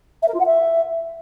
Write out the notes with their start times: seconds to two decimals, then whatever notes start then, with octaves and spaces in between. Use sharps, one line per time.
0.22 E5
0.28 A#4
0.34 F4
0.39 F#5
0.45 E5